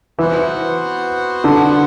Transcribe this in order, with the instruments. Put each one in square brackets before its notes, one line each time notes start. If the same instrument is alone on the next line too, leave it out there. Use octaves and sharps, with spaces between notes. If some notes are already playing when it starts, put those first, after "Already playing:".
[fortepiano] E3 [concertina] B3 F#4 C5 F#5
[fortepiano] D3